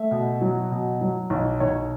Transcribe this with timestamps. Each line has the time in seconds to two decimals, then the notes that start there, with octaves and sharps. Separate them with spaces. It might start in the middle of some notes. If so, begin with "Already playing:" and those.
Already playing: A3 E5
0.11 B2
0.41 F#3
0.71 B2
1.01 F#3
1.30 B1
1.60 B1 C#5